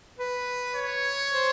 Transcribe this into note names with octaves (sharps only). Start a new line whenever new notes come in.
B4
C#5
C5